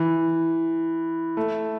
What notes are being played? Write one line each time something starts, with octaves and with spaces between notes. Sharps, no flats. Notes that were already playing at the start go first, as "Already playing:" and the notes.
Already playing: E3
A3